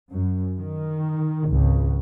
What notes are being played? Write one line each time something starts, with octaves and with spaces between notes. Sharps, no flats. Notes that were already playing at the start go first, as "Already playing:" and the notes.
F#2
D#3
G#1 C#2